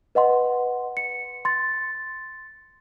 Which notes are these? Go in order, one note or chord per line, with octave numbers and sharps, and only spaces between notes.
B4 D#5 F#5 C6
C#7
C6 A6